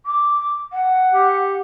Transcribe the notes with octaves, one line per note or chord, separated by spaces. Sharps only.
D6
F#5
G4